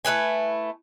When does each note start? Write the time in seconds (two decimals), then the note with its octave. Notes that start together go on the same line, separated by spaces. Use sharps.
0.05 A3 E4 B4 G#5